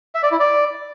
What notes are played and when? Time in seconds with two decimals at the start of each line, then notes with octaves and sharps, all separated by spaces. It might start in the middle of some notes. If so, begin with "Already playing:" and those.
0.15 E5
0.23 D5
0.31 E4
0.40 D5